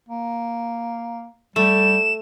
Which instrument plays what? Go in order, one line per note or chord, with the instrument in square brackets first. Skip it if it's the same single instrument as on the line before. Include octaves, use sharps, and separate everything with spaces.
[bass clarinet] A#3
[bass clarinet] G3 [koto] A3 [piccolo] E7